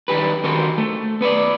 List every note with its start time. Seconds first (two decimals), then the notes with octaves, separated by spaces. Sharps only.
0.08 D#3 G3 G4 B4
0.44 D3 D#3 F#4 G4 A#4 C5
0.78 A3
1.21 B3 B4 C5 D5